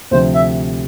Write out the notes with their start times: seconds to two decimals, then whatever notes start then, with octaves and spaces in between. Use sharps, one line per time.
0.11 D2 C3 F3 C5
0.34 E5